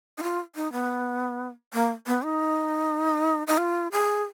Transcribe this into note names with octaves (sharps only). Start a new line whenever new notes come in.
D#4
F4
D#4
B3
A#3
B3
D#4
D#4
F4
G#4